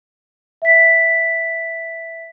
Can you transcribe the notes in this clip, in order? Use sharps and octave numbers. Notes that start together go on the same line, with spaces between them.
E5 B6